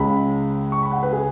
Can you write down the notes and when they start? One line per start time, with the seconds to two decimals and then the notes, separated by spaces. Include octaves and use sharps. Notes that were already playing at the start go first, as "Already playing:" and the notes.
Already playing: C#2 C#3 G#3 B5
0.72 C#6
0.83 B5
0.92 F#5
1.03 B4
1.12 G#4